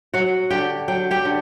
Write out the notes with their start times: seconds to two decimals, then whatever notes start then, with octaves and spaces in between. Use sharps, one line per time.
0.14 F#3 F#4 F#5
0.50 D3 G4 G5
0.88 F#3 G5
1.11 G4 G5
1.25 D3